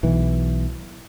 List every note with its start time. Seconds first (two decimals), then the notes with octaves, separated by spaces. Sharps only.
0.03 B1 E3